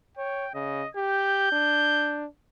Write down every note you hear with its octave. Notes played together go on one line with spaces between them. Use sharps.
C#5 G5
C#3 D#5
G4 G6
D4